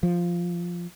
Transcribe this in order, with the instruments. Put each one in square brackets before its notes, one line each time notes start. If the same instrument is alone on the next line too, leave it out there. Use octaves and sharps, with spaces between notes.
[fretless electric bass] F3